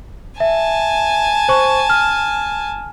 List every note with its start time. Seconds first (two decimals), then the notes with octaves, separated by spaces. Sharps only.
0.40 E5 G#5 A5
1.49 C5 C#6
1.90 F6